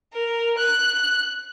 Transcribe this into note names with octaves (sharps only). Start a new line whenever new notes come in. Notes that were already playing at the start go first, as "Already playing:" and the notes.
A#4
F#6